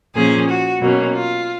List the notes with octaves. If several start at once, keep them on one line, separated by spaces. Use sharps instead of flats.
A#2 F3 A#3 C#4 G#4
F#4
B2 F#3 A#3 C#4
F4